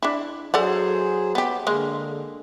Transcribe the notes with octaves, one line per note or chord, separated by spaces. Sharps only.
D4 E4
F#3 G#4 A4 C5 D5 F#5
B3 G4
D3 G#3 A#3